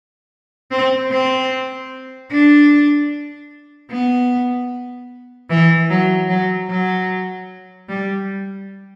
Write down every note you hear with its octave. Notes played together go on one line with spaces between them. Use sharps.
C4
C4
D4
B3
E3
F#3
F#3
F#3
G3